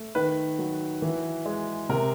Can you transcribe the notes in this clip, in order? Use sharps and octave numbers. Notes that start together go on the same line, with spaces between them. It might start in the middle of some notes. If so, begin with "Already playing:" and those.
Already playing: A3
D#3 B4
F#3
E3
G#3
C3 A#4